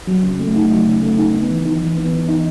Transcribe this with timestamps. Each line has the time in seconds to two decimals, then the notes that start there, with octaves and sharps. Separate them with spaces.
0.07 F#3
0.23 C#3
0.39 A3
0.56 D#4
0.71 F#3
0.87 C#3
1.02 A3
1.18 D#4
1.34 B3
1.50 E3
1.65 D#4
1.81 E3
1.97 B3
2.13 E3
2.28 D#4